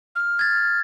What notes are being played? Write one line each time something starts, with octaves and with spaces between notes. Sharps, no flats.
F6
G#6 A6